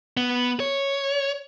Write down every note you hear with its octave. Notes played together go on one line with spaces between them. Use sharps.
B3
C#5